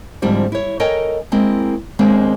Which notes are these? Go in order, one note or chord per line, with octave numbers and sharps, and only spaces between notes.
G#2 D3 F3 G3 C4 E4
E4 C#5
A4 A#4 C#5 D#5 G5 G#5
G#3 A#3 C4 E4
D#2 G#3 A#3 C4 D4